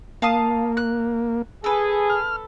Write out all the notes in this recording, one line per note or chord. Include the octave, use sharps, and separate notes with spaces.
A#3 F5 A5 D#6
F#6
G#4 A4 B4
F6